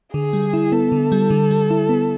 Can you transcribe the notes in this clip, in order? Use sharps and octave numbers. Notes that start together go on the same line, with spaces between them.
D3 G#4
G3
E4
B3 A4
D3
G3
D3
G3
E4
B3